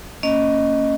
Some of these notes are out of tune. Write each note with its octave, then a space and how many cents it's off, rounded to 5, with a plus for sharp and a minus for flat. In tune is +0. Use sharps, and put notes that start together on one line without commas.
A#3 -25 C#4 +0 D#5 +0